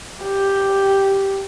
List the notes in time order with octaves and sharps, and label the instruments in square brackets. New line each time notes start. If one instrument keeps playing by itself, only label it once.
[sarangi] G4